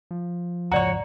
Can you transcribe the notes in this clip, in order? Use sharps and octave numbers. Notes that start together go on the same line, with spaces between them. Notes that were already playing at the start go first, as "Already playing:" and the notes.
F3
E1 C#2 G#2 F#4 C#5 D5 A#5